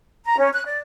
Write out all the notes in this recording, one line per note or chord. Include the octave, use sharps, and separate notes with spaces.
A#5
C#4
F#6
D5